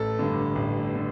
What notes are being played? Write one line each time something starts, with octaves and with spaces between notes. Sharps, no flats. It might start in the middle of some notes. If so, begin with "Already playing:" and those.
Already playing: A1 A4
G2 D3
A1
D3